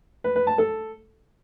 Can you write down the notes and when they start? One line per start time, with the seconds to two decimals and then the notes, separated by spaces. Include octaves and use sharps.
0.24 B4
0.36 B4
0.47 A5
0.58 A4